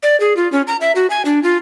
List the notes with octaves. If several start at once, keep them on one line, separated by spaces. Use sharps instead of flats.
D5
G#4
F4
C#4
A#5
E5
F#4
G#5
D4
F4